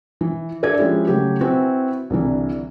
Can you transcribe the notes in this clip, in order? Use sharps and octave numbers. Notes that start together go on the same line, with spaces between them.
E3
D4 A4 D5 E5 G#6
F3 G#3 C#4 E4 G4
C#3 F#3 A3 F#4 G4
C4 E4 F#4 B4 G#5
C2 D3 E3